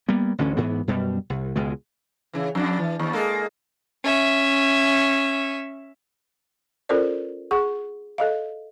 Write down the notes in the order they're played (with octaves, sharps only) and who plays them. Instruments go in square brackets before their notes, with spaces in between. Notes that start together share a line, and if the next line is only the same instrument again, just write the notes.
[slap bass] G3 A#3 B3
A1 D2 D3 C#4
G#2 E3 B3
F#2 B2 G3
C2
C#2 B2 G#3
[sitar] C#3 E3
F2 D4
E3
D#2
G#3 A#3 A4
[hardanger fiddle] C#4 E5
[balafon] C#4 F4 A4 A#4 C5 D5
G#4 F#5 C#6
A4 D#5 F5